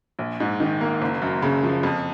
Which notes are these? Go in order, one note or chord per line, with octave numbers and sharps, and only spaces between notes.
A#1
G#2
D#3
A#3
F#1
F#2
C#3
F3
F2